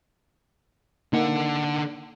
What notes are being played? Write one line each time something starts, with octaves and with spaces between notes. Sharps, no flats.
D3 A#3 D#4 F#5